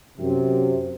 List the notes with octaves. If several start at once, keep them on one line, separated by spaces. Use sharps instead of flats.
F#2 C3